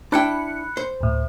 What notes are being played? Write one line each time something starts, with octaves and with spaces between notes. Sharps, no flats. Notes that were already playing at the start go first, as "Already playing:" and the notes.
D4 E4 G5 B5 F#6 C#7
C5
D2 A2